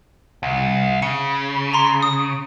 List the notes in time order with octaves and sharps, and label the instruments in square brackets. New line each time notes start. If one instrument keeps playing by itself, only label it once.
[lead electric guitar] C2
[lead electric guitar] C#3 [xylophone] C#7
[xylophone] A#5 C6
D#6